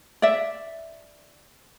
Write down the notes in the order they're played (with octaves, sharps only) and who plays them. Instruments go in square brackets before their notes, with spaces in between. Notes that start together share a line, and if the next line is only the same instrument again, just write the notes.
[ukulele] D5 E5